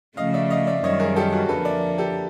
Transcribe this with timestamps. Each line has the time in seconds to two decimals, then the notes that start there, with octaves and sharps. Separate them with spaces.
0.17 C#3 F3 A3 D#5 F5
0.34 D5 E5
0.50 D#5 F5
0.67 D5 E5
0.83 F#2 D#3 G3 C#5 D#5
1.00 G#4 A#4
1.16 G4 A4
1.32 F#4 G#4
1.49 F2 D3 F3 A#3 A4 B4
1.65 D5 E5
1.98 G4 A4